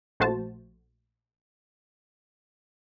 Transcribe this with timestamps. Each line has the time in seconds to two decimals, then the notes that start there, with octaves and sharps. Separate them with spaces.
0.20 A#1 A3 F#4 C5 A5